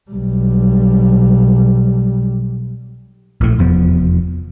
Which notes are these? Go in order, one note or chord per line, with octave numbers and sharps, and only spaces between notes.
B1 G3
A#1 A2
F1 E2 F3 B3